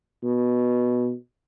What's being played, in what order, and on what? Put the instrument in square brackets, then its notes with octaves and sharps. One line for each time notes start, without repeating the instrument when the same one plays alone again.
[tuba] B2